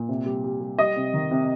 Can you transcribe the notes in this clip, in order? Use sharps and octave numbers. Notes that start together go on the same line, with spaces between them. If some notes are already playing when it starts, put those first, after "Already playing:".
Already playing: A#2
C3
G3
G3
G3
G3 D#5
C3
D#3
C3